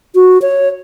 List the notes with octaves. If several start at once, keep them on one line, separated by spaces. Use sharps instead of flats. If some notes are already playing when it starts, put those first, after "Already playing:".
F#4
C#5